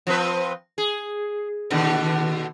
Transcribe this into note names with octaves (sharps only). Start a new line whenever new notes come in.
F3 C4 B4
G#4
D#2 B2 D3